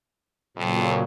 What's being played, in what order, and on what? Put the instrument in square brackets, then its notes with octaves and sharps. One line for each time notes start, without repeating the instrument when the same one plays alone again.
[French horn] F2 [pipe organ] A#2 C#3 F#3